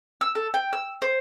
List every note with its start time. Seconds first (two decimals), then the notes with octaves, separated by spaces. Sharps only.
0.21 E6
0.35 A4
0.54 G5
0.73 E6
1.02 C5